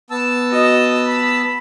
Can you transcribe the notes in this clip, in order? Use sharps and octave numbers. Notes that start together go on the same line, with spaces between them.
B3 A5 E6
F#4 D#5
B5